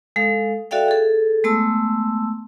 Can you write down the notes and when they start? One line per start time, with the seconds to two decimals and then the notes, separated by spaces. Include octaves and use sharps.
0.16 G#3 A4 F5
0.71 F#4 A4 D5 E5 F5 G5
0.88 G#4 A4
1.44 G#3 A3 B3 A5 C6 E6